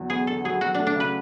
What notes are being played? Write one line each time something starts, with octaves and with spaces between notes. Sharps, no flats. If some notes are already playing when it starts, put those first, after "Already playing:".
Already playing: E2 D3 F#3
B3 G#4
D3 A4
F#3 G#4
F#3 F#4
A3 D4
D4
C#3 B4